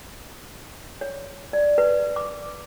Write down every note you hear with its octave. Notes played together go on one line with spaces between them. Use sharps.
C#5
D5
B4
D6